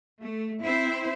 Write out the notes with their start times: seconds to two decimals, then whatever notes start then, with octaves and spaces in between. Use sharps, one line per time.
0.23 A3
0.62 C4 E4 C5